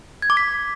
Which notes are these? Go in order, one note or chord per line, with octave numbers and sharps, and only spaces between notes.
G#6
D6
B6